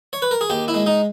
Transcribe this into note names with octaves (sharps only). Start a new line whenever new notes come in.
C#5
B4
A#4
G#4
D#2 G4
E4
G#3
D#4